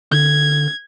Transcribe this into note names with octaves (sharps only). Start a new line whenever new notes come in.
D3 G#6